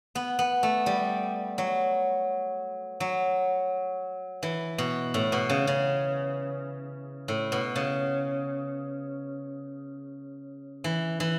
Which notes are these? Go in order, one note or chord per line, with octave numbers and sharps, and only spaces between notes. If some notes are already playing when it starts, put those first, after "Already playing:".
B3
B3
A3
G3
F#3
F#3
E3
B2
A2
B2
C#3
C#3
A2
B2
C#3
E3
E3